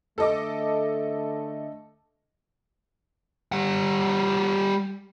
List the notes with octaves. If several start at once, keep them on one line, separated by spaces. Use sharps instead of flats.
D3 A3 A4 D#5 D6
G3 F#5